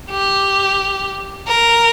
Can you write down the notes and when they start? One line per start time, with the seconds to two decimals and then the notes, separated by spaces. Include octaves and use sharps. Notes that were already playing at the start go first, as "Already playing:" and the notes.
0.11 G4
1.48 A#4